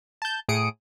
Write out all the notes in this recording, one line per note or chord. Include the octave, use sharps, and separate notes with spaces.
A5 G6
A2 G#4 D#6 C#7 D7